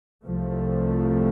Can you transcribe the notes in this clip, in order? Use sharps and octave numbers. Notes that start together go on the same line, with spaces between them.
C2 C3 F3 A3